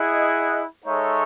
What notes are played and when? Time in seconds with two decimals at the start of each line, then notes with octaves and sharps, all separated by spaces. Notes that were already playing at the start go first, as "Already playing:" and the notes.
Already playing: E4 G#4 D#5 F#5
0.84 G#3 D#4 A4 C#5 E5